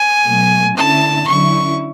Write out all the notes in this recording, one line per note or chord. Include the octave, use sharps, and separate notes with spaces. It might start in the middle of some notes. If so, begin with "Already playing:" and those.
Already playing: G#5
B2 F#3 A3
D3 A3 C#4 E4 A5
D3 F#3 C#4 E4 C#6